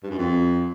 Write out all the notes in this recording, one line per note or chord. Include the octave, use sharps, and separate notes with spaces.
G2
F#2
F2